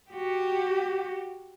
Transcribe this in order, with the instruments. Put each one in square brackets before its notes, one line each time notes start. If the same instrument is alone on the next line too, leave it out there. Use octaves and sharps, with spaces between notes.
[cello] F#4 G4